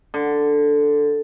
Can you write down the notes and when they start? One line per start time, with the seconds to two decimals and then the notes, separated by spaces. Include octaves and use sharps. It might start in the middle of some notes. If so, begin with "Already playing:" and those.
0.14 D3